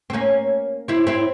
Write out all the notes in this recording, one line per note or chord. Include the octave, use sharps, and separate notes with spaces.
C4
A#3 C#4
C4 E4
C4 E4